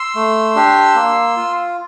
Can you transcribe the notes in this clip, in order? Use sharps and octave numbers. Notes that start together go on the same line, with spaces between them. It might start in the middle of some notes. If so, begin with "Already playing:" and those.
Already playing: C6 E6
A3
D4 G4
A#3
F4